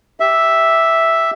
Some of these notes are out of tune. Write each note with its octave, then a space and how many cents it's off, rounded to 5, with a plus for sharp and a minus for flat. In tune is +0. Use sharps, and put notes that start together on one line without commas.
G4 +0 E5 +0